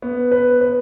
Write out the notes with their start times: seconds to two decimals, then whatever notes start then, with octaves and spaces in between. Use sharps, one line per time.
0.02 B3
0.31 B4
0.61 B4